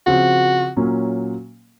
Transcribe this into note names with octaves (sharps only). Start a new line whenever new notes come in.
C#3 F3 C4 F4 F#4
A#2 F#3 A#3 C#4